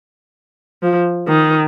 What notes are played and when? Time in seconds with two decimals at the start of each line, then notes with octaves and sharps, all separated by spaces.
0.83 F3
1.28 D#3